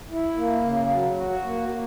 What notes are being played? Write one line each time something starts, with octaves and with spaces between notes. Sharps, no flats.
E4
A#3
C#3
F#3
F#4
A#3
A#3